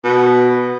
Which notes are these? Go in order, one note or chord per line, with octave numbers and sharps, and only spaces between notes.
B2